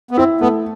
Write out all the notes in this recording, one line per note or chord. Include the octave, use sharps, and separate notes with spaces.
B3
C4 E4
A3 B3